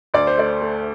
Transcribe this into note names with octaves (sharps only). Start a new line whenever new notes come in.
D2 D5
C5
A3 D5
A3